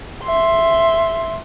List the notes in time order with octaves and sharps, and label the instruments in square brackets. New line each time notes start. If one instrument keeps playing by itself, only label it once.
[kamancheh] E5 C6